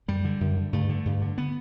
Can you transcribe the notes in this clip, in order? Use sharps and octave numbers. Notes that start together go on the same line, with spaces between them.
F#2 G3
D3
F#2
D3
G2 A3
D3
G2
D3
B3